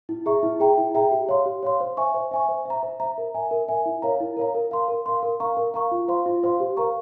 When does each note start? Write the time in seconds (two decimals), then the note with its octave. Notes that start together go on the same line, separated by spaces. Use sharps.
0.09 E4
0.26 G#4 E5 A#5 C#6
0.43 E4
0.60 G#4 E5 G5 A#5
0.77 E4
0.95 G#4 E5 G5 A#5
1.11 G4
1.29 C#5 F5 C6
1.46 G4
1.63 C#5 F5 C6
1.80 C5
1.97 E5 G#5 C#6
2.14 C5
2.31 E5 G#5 C#6
2.49 C5
2.65 E5 A#5
2.83 C5
3.00 E5 A#5
3.18 A#4
3.34 E5 G#5
3.51 A#4
3.69 E5 G#5
3.86 E4
4.02 A#4 C#5 F5 A#5
4.20 E4
4.37 A#4 C#5 F5 A#5
4.55 A#4
4.71 F5 C6
4.88 A#4
5.06 F5 C6
5.23 A#4
5.40 F5 A#5 C#6
5.57 A#4
5.74 F5 A#5 C#6
5.92 F4
6.08 C5 F5 C6
6.26 F4
6.43 C5 F5 C6
6.60 G4
6.77 A#4 F5 A#5 C#6